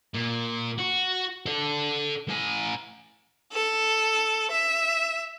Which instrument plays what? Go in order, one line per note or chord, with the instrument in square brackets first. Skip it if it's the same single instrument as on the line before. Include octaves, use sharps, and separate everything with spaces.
[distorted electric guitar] A#2
F#4
A4 D5
A2 G#5
[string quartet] A4
E5